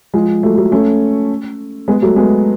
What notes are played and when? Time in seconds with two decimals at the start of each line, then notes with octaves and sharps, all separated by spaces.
0.14 F3 G#3
0.43 F#3 A3
0.57 F#3 A3
0.72 A3 C#4
1.88 G#3 B3
2.02 F#3 A3
2.16 G#3 B3